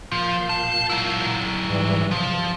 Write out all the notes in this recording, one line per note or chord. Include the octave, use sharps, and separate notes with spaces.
A#2 F3 F5 G6
A5
F#3 E4
G#2 E3 G3
C3 F3